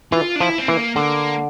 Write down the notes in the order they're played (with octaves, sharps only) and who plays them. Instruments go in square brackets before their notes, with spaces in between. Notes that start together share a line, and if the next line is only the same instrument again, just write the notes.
[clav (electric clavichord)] E3 [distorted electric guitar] F4
[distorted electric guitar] D4
[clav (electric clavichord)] F3 [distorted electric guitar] E4
[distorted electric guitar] C4
[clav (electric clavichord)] E3 [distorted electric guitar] A#3
[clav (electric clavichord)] D3 [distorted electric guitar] A#3